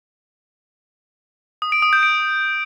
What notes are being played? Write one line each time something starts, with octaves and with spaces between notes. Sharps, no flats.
D#6
D7
D#6
G6
D7